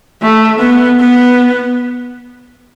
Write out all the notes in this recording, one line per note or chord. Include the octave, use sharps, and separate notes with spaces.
A3
B3
B3